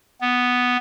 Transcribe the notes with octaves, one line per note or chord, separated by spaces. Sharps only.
B3